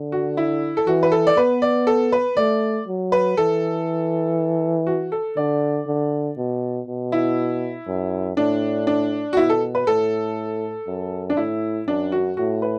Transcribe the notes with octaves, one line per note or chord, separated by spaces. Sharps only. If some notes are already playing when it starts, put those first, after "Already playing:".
Already playing: D3
F#4
E4
A4
E3 F#4
B4
A4
D5
B3 B4
D5
A4
B4
A3 D5
F#3
B4
E3 A4
F#4
A4
D3 D5
D3
B2
B2
E4
F#2
A2 D4
D4
F#4
B2 E4
A4
B4
A2 A4
F#2
D4
A2 E4
F#2 D4
F#4
A2 F#4
B4